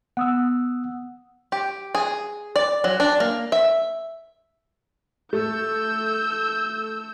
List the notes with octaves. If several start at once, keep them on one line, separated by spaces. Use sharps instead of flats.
B3 F#5 D#6 E6
G4
G#4
D5
F#3
D4
A#3
E5
A3 E6 G6